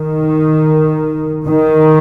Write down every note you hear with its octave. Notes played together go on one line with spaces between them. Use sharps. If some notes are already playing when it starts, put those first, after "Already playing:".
Already playing: D#3
D#3